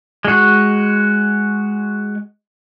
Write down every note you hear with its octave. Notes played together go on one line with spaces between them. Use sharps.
G#3 F#4